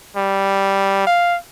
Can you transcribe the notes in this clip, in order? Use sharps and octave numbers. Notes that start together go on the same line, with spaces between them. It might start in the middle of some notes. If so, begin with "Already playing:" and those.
G3
F5